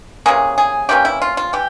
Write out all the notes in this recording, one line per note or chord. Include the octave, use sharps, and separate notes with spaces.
C3 E3 A#3 C#4 G#4
G#4
C3 E3 A#3 C#4 G4
E4
F4
F4
E3 G4